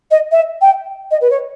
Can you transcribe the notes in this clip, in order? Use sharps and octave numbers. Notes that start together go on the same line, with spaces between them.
D#5
E5
G5
D#5
B4
C#5